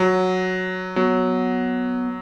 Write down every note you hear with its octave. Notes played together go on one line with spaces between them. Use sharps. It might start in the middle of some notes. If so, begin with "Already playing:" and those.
Already playing: F#3
F#3 B3